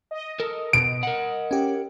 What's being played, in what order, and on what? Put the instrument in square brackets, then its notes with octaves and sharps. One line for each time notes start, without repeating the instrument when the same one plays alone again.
[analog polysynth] D#5
[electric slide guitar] A4 A#4
[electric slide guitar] B2 [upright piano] D7
[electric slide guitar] A#4 F#5
[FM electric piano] C#4 G4